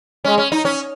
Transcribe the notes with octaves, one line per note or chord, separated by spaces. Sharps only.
G#3 C#4
C#4
D#4
C#4